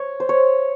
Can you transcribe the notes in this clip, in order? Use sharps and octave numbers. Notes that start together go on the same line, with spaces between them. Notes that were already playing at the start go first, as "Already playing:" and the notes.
Already playing: C#5
C5
C#5